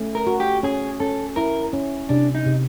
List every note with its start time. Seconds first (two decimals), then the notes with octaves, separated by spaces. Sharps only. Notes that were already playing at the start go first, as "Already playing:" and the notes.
Already playing: A3 C#4
0.15 A#4
0.27 F#4
0.40 G4
0.63 C#4 G#4
1.00 C#4 A4
1.36 E4 A#4
1.73 C#4
2.09 C3 D4
2.35 D#4
2.46 C3